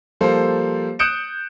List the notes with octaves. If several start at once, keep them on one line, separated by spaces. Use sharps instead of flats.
F3 G3 A#3 A4 C5
D#6 F#6 G6 C#7 D7 E7